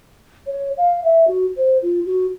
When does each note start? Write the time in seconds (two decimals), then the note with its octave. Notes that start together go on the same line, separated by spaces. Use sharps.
0.47 C#5
0.78 F5
1.04 E5
1.28 F#4
1.57 C5
1.82 F4
2.06 F#4